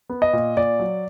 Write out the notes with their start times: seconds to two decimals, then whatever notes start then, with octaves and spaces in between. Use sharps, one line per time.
0.09 B3
0.22 D#5
0.33 A#2
0.57 A#2 D5
0.79 F#3